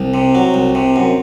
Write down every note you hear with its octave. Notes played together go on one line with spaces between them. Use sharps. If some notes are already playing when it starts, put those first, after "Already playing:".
Already playing: C2
C3
F#3
C2
C3
F#2